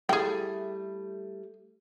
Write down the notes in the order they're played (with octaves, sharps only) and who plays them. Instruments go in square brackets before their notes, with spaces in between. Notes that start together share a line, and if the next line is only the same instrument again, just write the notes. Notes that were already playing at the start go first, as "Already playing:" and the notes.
[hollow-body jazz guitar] G3 A3 E4 [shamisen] G#4 G5